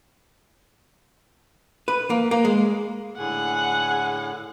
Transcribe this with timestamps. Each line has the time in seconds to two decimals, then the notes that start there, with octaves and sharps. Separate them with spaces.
1.88 B4
2.10 A#3
2.31 A#3
2.45 G#3
3.18 A2 D3 G#4 F#5